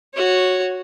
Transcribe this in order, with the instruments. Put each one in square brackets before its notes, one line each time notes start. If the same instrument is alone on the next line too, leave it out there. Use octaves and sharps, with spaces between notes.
[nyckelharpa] F#4 C#5